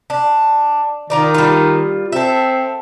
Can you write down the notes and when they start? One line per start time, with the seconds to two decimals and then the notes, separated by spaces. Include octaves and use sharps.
0.10 D4
1.10 D#3 F4 A#4 D5
1.34 G3 F4
2.12 C4 A4 E5